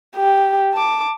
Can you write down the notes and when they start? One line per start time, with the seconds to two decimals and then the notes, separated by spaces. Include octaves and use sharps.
0.15 G4
0.73 A5 D6